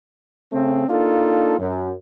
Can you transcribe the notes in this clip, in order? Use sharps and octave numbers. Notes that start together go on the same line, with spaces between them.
C#3 A3 C4
A#3 D4 D#4 F4 A4
F#2